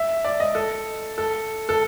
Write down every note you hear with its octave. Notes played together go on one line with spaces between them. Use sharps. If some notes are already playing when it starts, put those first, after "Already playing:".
Already playing: E5
D5
D#5
A4
A4
A4